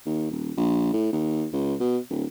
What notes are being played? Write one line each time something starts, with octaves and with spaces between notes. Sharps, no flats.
D#2
D#1
A#1
A2
D#2
C#2
B2
D1